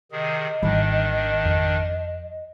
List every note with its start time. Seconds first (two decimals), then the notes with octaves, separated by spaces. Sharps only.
0.12 C3 D#3 G#4 D#5
0.63 G#1 D#3 E3 G3 D4
1.46 F2